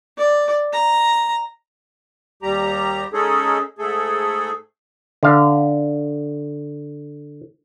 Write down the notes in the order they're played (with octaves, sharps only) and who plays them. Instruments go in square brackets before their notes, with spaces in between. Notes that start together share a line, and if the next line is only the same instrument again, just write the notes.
[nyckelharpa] D5
A#5
[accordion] D#2 G3 G4 A#5
G#3 C#4 D#4 G#4 A4
G#2 A3 G#4 A4
[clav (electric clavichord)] D3 F5